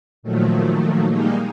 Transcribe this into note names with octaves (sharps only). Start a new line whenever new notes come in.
A#2 D#3 F3 F#3 A3
G3 G#3 A#3 D#4